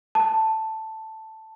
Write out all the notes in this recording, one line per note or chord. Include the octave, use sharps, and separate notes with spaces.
A5